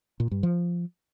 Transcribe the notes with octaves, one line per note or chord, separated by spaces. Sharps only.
A#2
G2
F3